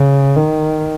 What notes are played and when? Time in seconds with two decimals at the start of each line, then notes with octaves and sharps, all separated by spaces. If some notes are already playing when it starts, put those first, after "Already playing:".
Already playing: C#3
0.36 D#3